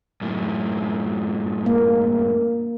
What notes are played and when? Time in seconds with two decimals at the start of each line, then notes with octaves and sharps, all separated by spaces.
0.21 F#2 A2
1.66 A#3